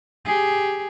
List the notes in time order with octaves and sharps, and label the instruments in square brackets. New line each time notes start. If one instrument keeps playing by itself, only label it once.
[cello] G4 G#4